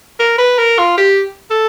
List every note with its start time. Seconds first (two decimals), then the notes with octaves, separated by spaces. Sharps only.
0.19 A#4
0.38 B4
0.58 A#4
0.79 F4
0.98 G4
1.51 A4